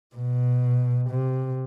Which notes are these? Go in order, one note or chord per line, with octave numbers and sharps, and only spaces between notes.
B2
C3